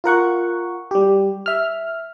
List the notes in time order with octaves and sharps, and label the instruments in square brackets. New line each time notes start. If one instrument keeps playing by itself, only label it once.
[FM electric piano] F4 A#4 F#5 C#6
G3 G4
E5 F6